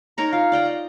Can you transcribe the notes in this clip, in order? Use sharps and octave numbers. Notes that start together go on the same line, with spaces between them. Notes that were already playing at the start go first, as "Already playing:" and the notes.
D#4 A#4 C#5 A#5
F4 F5
D5 G5 A#5
D#5